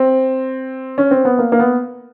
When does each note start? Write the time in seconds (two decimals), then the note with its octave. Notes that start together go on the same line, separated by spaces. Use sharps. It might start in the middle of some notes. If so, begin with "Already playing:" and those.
Already playing: C4
0.98 C#4
1.11 C4
1.25 B3
1.39 A#3
1.52 A#3
1.59 B3